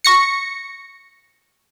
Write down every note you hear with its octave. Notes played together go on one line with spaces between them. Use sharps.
C#6 A#6 C#7